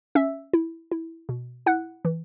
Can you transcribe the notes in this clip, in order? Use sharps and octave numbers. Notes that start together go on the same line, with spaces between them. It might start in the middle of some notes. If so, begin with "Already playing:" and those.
C#4 E5 E6
E4
E4
B2
E4 F#5 F#6
E3